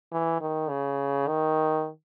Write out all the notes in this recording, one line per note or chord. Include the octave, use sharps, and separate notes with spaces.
E3
D#3
C#3
D#3